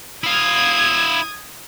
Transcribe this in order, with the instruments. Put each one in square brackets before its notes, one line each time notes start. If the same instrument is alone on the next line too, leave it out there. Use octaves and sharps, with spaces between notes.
[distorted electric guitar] E4 F5 [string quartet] D#6 G#6